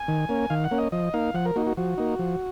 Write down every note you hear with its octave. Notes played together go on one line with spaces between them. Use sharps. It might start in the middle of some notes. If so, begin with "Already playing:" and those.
Already playing: G#5
D#3
A#3 C#4
D#3 F5
F#5
A#3 C#4
D#5
F3 D#5
A#3 D#4 F5
F3 F#5
A#4
A#3 D#4 F#4
F#4
F3 F#4
A#3 D#4
F3